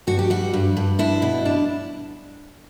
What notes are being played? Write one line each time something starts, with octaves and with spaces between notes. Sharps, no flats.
G2 F#4
G4
G3 F#4
G2
G2
D4 E4
B2
D4